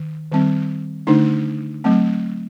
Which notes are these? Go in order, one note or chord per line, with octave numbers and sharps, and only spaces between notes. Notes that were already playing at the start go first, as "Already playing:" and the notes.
Already playing: D#3
D#3 G3 C4
D3 A3 D4 D#4
F#3 A3 C4